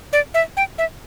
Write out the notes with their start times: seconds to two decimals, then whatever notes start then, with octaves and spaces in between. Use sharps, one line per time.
0.13 D5
0.34 E5
0.57 G5
0.78 E5